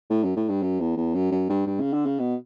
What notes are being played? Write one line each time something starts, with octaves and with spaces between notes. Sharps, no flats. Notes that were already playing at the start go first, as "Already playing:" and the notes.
A2
F#2
A2
G2
F#2
E2
E2
F#2
F#2
G2
G2
C#3
D3
C#3
B2